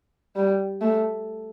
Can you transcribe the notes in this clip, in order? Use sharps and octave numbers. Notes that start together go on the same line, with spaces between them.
G3
A3